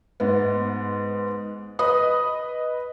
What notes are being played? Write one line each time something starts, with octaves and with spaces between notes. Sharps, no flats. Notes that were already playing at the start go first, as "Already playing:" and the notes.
G#2 B3
B4 D#5 B5 D#6